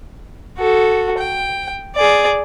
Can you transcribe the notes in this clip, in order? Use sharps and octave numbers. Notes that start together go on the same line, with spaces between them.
F#4 A4
G5
G#4 D5